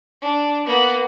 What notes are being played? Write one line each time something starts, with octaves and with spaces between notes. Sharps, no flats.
D4
A#3 B3